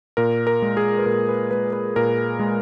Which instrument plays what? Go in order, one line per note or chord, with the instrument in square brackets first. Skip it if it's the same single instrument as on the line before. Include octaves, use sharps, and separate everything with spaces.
[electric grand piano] A#2 A#4
A#4
G#3
G#4
B4
A#2 A#4
B4
G#3 B4
B4
A#2 A#4
G#3